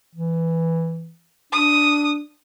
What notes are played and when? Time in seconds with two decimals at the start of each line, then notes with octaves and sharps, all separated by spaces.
0.15 E3
1.53 D4 D#6